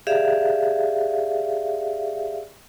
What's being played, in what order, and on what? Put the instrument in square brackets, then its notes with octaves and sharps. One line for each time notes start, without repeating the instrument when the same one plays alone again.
[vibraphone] G4 G#4 D5 E5 F5